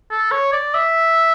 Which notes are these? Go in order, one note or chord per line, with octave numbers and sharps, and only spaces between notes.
A4
C#5
D5
E5